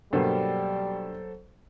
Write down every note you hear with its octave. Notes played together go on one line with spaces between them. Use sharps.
G2 B2 F#3 G3 A#3 A4 C5